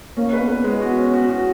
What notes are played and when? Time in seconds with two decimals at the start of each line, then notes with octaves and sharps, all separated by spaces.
0.17 A#3 C#4
0.33 B4
0.40 B3
0.48 B4
0.64 G#3
0.80 F#4
0.98 C#4
1.14 F#4
1.29 F#4